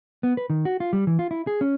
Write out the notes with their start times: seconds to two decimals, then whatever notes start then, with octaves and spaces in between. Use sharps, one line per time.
0.23 B3
0.37 B4
0.50 D#3
0.65 F#4
0.80 F4
0.93 G3
1.07 E3
1.19 F4
1.31 E4
1.47 G#4
1.61 C#4